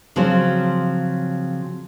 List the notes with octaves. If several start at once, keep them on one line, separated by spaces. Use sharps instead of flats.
C#3 F3 F#3 C4 C5